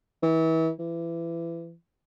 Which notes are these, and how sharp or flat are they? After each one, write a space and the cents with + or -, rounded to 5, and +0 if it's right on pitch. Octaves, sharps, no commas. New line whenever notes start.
E3 -30
E3 +25